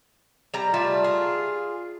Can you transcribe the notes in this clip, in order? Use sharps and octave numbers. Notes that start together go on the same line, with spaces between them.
G3 A#5
G3 A3 F4 A5
G#4